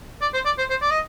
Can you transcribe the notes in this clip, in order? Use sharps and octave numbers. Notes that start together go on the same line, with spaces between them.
D5
C5
D5
C5
C5
D5
D#5